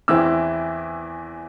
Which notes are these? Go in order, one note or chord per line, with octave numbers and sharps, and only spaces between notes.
E2 E3 C4 E4 E6